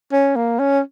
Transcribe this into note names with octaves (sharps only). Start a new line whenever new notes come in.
C#4
A#3
C#4